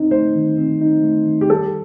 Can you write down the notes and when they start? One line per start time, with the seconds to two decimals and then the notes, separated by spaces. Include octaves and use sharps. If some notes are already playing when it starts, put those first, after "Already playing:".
Already playing: C4 D#4
0.11 A3 C5
0.35 D#3
0.58 C4
0.81 D#4
1.03 A3
1.26 D#3
1.41 G4
1.50 G3 A4